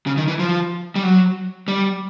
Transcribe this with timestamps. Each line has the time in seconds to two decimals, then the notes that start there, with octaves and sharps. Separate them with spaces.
0.07 C#3
0.18 D#3
0.28 E3
0.39 F3
0.96 G3
1.03 F#3
1.68 G3